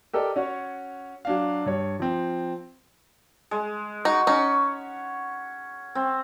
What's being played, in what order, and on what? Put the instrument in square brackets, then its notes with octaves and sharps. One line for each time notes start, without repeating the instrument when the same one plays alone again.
[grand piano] G4 A4 A#4 D5 D#5
C#4 F#4 C#5
F#3 D4 F5
G2 C#5
F3 C4
[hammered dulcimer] G#3
[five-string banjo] D#4 [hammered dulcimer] F#4
[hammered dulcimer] C#4 [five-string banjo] D#4
[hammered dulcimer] C4